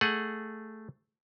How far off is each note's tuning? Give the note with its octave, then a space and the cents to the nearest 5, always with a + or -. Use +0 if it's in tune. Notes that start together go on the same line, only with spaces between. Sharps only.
A3 +0 G#4 +0 F#5 +0